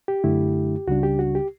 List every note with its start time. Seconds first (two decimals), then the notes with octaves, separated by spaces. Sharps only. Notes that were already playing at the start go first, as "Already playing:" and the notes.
0.08 G4
0.24 F#2 D3 A3 E4
0.87 C#2 C#3 G3 D4 F#4
1.03 G4
1.19 F#4
1.35 G4